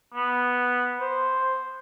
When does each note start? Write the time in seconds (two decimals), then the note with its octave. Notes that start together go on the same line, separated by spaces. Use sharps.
0.14 B3
1.00 C5